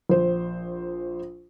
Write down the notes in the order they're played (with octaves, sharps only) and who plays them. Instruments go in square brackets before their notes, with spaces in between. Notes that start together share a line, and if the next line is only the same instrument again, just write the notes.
[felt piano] A#1 C5